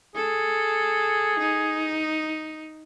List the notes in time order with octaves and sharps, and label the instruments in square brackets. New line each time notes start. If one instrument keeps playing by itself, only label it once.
[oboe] G#4 [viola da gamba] A4
[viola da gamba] D#4